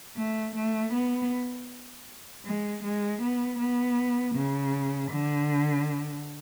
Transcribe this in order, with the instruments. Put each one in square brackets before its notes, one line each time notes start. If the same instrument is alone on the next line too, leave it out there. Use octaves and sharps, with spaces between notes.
[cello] A3
A3
B3
G#3
G#3
B3
B3
C#3
D3